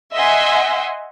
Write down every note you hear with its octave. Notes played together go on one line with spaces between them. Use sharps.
D#5 E5 F#5 G#5 C6